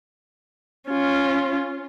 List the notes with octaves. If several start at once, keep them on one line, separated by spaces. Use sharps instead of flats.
C#4 F4